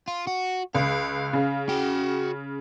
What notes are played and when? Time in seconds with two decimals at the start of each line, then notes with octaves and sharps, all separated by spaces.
0.08 F4
0.27 F#4
0.75 C#2 F5
1.33 C#3
1.69 F#4 G5